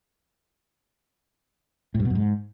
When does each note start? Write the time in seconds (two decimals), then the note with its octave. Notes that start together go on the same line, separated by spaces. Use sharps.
1.95 A2
2.00 G2
2.05 B2
2.10 F#2
2.15 G#2